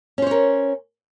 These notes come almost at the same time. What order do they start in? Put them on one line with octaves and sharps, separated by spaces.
C#4 C5 C#5 A#4